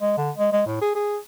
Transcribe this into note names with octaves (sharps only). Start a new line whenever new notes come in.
G#3
D3
G#3
G#3
A2
G#4
G#4